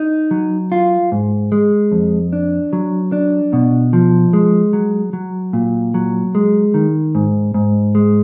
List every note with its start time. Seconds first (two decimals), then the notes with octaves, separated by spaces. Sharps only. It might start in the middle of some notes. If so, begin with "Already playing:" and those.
Already playing: D#4
0.31 F#3
0.72 F4
1.12 G#2
1.52 G#3
1.92 F2
2.33 D4
2.73 F#3
3.12 D4
3.53 B2
3.93 F3
4.33 G#3
4.73 F#3
5.13 F#3
5.53 A#2
5.94 F#3
6.35 G#3
6.74 D#3
7.15 G#2
7.54 G#2
7.95 G#3